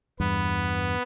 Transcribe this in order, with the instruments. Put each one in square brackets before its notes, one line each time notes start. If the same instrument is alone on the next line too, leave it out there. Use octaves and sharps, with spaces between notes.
[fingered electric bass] E2 G2 [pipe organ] B3